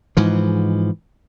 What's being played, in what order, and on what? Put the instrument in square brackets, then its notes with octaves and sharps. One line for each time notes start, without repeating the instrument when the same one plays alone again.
[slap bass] G#2 E3 F3